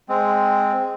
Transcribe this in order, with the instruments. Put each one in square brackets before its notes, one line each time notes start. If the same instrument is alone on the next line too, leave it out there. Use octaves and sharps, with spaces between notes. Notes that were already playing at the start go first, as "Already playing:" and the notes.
[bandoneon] G#3 C4